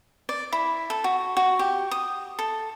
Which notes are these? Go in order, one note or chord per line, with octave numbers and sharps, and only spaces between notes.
D5
E4
A4
F#4
F#4
G4
D#6
A4